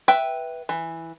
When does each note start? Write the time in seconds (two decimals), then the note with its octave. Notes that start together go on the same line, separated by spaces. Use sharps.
0.08 B4 E5 G5
0.69 E3